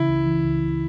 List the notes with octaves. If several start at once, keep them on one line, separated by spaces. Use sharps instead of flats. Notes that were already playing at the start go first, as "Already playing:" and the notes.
Already playing: C#3 E3 E4
C#2
E3
C#2
C#2